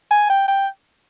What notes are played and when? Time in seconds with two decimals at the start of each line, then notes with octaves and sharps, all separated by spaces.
0.11 G#5
0.30 G5
0.48 G5